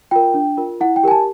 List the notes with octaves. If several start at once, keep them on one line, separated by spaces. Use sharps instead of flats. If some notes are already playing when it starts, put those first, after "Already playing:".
F4 A#4 G5
D4
F4 A#4
E4 F#5
G5
G4 A#4 G#5
A5